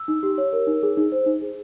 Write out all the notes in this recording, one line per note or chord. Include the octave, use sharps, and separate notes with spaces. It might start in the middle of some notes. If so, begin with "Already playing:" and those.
Already playing: E6
D#4
G4
C#5
A#4
D#4
G#4
D#4
C5
D#4
G#4